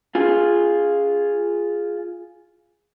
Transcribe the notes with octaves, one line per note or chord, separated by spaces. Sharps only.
F4 G#4